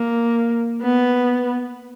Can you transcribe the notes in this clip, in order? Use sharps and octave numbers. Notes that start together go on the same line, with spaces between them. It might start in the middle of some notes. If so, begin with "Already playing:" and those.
Already playing: A#3
B3